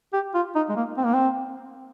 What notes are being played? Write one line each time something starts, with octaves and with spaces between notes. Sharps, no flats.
G4
F4
D#4
G#3
A#3
C4
A#3
C4